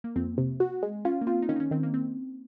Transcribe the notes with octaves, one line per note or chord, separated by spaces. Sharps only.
A#3
F2 C4
C3
F#4
G#3
C#4 F4
A#3
C4 F4
D#4
D#3 C#4
D#4
C#4
D#3 C4
A#3
C4